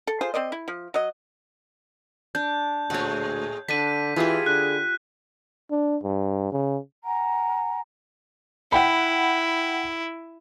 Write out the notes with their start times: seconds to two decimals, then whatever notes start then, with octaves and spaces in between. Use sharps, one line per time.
0.07 A4
0.21 F4 G#4 C5
0.34 C4 C5 D5 D#5
0.52 E4
0.68 F3
0.94 F#3 D#5
2.35 D4 G6
2.90 D2 A2 G#3 A3 C#5 F#5
3.68 D3 D4 A5 B6 D#7
4.16 E3 G#3 E4 F4 G4 G#4
4.46 D3 F#6
5.71 D4
6.03 G2
6.52 C#3
7.04 F#5 G#5 A#5
8.72 E4 F#5 G5 B5